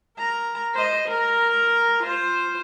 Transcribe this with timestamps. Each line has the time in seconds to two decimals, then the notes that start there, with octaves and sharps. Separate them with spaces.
0.18 A#4 A#5
0.75 C5 D#5
1.08 A#4 A#5
2.03 F4 C5